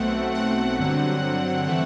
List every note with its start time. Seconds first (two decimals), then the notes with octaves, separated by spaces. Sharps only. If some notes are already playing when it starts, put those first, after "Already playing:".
Already playing: B1 B2 A3 C4 F#5
0.35 F#5
0.79 G2 D3 F#3 C4
1.66 E3 A3 C4